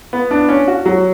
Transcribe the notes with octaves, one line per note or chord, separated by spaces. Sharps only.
B3
D4
C#4
F#4
F#3